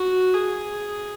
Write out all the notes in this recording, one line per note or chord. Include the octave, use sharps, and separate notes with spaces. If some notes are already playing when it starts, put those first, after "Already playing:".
Already playing: F#4
G#4